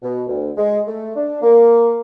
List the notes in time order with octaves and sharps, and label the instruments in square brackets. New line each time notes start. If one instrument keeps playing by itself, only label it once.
[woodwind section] B2
D2
G#3
A3
D4
A#3